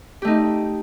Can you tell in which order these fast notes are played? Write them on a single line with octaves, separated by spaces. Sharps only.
G4 A3 D#4